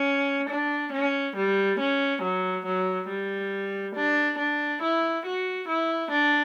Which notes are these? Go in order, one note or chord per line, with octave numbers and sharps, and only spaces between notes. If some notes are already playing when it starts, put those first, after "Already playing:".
Already playing: C#4
D4
C#4
G3
C#4
F#3
F#3
G3
D4
D4
E4
F#4
E4
D4